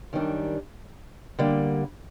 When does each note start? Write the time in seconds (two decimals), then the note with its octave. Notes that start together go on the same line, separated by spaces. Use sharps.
0.13 F#2 D#3 G3 D4
1.39 D3 G3 A#3